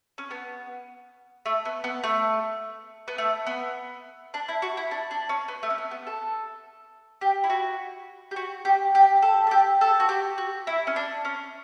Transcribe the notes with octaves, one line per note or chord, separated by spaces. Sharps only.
C#4
B3
A3
B3
B3
A3
B3
A3
B3
D4
E4
F#4
E4
D4
D4
C#4
B3
A3
C#4
B3
B3
A4
G4
E4
F#4
G4
F#4
G4
G4
A4
A4
G4
A4
F#4
G4
F#4
E4
C#4
D4
C#4